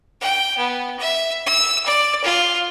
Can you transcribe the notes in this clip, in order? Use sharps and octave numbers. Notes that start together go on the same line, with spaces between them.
G5
B3
E5
E6
D5
F4